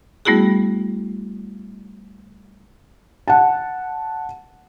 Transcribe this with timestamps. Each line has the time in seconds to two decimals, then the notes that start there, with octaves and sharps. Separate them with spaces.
0.25 G3 A3 B3 E4 F#4 G#4
3.28 F#5 A5